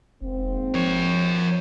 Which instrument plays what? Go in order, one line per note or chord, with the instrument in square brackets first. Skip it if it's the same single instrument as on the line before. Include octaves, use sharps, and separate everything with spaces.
[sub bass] F1 [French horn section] G#2 A#3 C4
[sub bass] F3 [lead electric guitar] A#4 C#5